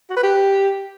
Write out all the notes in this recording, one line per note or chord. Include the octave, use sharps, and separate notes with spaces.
F#4
B4
G4